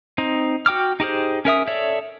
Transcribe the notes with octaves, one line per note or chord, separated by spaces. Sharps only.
C4 D#4
F#4 G5 D6 F6
D#4 G4 G#4 C5
C#4 A#4 E5 D#6
A4 C#5 D5 E5